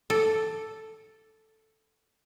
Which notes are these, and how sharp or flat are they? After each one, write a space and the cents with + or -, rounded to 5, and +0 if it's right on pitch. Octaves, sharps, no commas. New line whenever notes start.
A4 +0 D5 +0